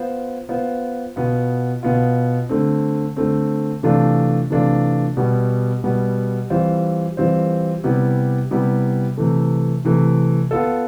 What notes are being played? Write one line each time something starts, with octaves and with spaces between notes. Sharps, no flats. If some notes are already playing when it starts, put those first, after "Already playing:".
Already playing: B3 F4 C5
B3 F4 C5
B2 B3 F4
B2 B3 F4
D3 A3 C4
D3 A3 C4
C3 E3 A3 D4 F4
C3 E3 A3 D4 F4
B2 G3 B3
B2 G3 B3
E3 G3 C4 F4 C5
E3 G3 C4 F4 C5
C3 G3 B3 E4 G4
C3 G3 B3 E4 G4
C3 E3 A3
C3 E3 A3
B3 F4 A4